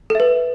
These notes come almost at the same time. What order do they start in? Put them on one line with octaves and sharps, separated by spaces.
A4 E5 B4